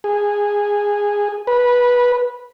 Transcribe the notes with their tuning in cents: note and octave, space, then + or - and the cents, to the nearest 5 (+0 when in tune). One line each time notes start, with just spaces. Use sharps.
G#4 -10
B4 -15